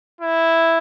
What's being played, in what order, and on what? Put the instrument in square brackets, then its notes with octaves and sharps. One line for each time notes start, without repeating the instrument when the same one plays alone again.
[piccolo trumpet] E4